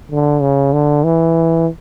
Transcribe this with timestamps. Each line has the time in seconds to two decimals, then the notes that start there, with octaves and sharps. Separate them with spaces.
0.11 D3
0.42 C#3
0.73 D3
1.04 E3